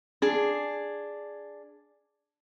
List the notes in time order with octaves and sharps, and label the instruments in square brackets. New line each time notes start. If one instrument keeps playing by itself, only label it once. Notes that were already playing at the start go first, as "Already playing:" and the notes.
[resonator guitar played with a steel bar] D4 G#4